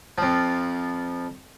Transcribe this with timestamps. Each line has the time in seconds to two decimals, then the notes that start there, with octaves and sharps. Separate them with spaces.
0.18 F2 F3